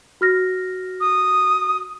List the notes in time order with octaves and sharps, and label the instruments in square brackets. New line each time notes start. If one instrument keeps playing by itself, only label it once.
[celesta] F#4 F6 A#6
[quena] D#6